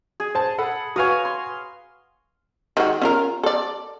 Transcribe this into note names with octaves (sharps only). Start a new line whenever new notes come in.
G#4
C5 A5
A4 F#5 B5
F#4 B4 C#5 F5 G#5 D#6
C6
D#3 G#3 F#4
C#4 F4 A#4
A4 D5